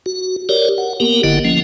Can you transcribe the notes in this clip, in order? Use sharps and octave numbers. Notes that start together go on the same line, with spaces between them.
F#4
G4 A#4 C#5 D5
F#5
A#3 B3 G4 A#4
G1 D3 E4 D#5 F#5
F3 A#3 C#4